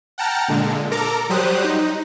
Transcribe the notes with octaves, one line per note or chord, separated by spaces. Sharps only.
F#5 G5 A5 A#5 F6
A#2 D3 G#3
A4 A#4 A#5 D6
F#3 G3 G4 C5 D#6 F#6
D#4